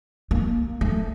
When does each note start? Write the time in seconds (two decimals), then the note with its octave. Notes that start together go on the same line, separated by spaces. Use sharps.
0.31 A#3
0.81 A3